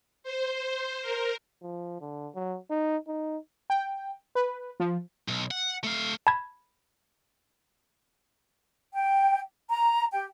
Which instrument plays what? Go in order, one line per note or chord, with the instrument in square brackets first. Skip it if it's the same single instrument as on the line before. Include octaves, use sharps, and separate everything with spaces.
[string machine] C5
A#4
[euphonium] F3
D3
F#3
D#4
D#4
[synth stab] G5
B4
F3
[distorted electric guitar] B1
F#5
A3 F5
[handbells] A5 B5 G#6
[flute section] G5
A#5
G4 G5